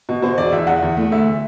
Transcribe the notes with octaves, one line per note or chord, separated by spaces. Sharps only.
B2
B2 C5
E1 D5
E2 E5
E2 F#5
E2
A3
D2 E5